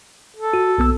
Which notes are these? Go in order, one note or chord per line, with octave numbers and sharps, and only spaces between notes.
A4
F#4
B1 B3 E6